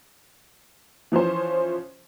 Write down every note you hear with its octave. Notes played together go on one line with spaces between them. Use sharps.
E3 F3 C#4 C5